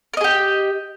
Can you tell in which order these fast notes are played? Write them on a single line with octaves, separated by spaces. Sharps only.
A#4 D#5 G#4 G4